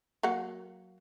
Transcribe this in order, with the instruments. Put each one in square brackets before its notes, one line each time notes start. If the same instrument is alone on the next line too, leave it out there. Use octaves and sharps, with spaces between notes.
[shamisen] F#3 A#3 F#5